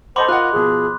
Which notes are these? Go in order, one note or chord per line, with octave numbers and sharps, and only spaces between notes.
A4 C5 D#5 F#5 B5 C6 D6
F4 A#4 D#5 F#5 F#6
B2 F3 G#4